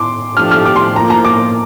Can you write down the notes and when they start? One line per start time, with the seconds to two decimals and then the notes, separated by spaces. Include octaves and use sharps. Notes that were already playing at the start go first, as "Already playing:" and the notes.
Already playing: C6 D6
0.36 F3 A3 D4 G4 F6
0.51 F6
0.65 D6
0.76 C6
0.96 F3 A#3 F4 A#5
1.10 A#5
1.25 D6